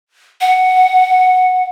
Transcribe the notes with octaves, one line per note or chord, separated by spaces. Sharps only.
F#5